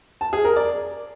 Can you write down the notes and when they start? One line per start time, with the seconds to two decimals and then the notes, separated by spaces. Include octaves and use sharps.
0.21 A5
0.33 G#4
0.45 A#4
0.56 D5